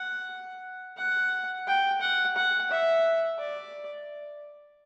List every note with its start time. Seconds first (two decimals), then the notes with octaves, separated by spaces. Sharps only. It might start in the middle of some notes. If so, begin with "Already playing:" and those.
Already playing: F#5
0.98 F#5
1.67 G5
2.02 F#5
2.36 F#5
2.71 E5
3.39 D5